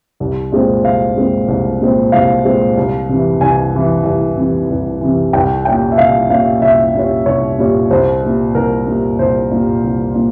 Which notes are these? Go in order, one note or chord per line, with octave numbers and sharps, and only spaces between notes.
C2
A#2 G#3 C4
C2 F5
A#2 G#3 C4
C2
A#2 G#3 C4
C2 F5
A#2 G#3 C4
C2
C3 E3
C2 G#5
C3 E3
C2
C3 E3
C2
C3 E3
C2 G5
A#2 G3 C#4 G5
E5
C2 F5
A#2 G3 C#4 F5
C2 E5
A#2 G3 C#4
C2 C#5
A#2 G3 C#4
C2 C5
A#2 G3
C2 A#4
A#2 G3
C2 C5
A#2 G3
C2
A#2